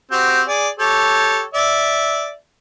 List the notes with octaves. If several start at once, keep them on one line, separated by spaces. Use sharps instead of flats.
C4 F#4 G4
G#4 D5
G4 A4 C#5
D5 E5